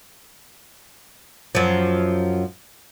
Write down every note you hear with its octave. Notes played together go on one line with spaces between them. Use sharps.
F#2 F3